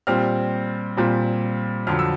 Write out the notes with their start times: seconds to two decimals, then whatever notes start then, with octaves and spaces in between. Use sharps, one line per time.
0.07 A#2 G3 C4 F6
0.97 A#2 G3 C4
1.87 F2 D3 F#3 F6
1.99 E6